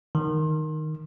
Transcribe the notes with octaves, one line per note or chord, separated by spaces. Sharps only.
D#3